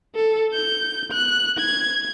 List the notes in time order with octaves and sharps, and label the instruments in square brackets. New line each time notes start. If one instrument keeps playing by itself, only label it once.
[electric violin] A4
G6
F#6
G#6